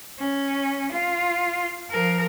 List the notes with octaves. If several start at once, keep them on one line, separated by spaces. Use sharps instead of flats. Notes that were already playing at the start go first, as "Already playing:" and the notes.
C#4
F4
F3 A#4